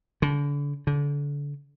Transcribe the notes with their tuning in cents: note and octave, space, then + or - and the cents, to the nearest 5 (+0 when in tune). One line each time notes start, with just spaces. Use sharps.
D3 -35
D3 -30